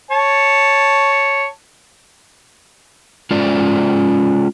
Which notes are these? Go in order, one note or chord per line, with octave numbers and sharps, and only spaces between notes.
C#5 A5
G#3 C#4 F4 D5